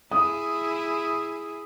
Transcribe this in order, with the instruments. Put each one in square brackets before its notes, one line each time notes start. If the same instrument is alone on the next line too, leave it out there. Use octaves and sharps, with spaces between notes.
[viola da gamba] E4 G#4 [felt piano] D#6